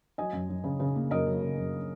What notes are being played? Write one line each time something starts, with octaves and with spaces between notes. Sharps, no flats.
F#3 D#5 G#5
F#2
F#2
C#3
C#3
A#3
F#2 A#4 D#5
F#2
C#3
F#2